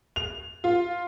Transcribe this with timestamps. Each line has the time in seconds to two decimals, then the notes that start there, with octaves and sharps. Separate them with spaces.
0.16 F7
0.64 F4